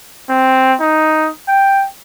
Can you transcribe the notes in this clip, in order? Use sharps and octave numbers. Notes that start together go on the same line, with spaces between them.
C4
D#4
G5